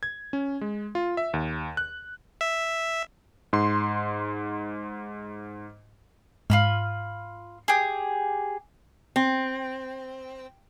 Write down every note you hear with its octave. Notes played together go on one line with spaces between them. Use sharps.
G#6
C#4
G#3
F4
E5
D#2
F#6
E5
G#2 C6
G#2 F4 B5 F6
G4 G#4
C4